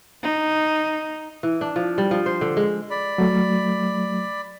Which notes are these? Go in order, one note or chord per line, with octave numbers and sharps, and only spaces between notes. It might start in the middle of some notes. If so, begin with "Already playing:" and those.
D#4
E3
D4
F3
G3
F3
C5
D3
G#3
D5 B5
F#3 A3